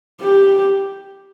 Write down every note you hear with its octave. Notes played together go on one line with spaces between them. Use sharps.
G4